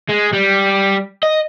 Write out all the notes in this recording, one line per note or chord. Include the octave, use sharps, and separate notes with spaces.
G#3
G3
D#5